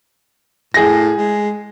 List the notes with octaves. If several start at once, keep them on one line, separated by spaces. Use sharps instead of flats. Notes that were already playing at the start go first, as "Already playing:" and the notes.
A2 G#4 A#6
G#3